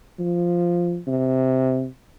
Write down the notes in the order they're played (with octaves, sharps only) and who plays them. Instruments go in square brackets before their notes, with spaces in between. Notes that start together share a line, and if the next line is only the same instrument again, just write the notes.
[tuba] F3
C3